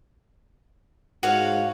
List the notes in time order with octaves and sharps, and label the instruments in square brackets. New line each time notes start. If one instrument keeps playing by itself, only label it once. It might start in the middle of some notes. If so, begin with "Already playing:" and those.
[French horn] G#2 [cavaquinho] F#4 C#5 F5